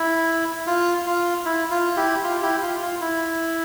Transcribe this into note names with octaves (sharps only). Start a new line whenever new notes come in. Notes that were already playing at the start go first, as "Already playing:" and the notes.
Already playing: E4
F4
F4
E4
F4
E4 G4
F4
E4 G4
F4
F4
E4